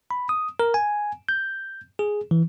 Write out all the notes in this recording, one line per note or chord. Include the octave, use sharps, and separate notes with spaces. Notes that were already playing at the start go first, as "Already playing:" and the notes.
B5
D#6
A#4
G#5
G6
G#4
E3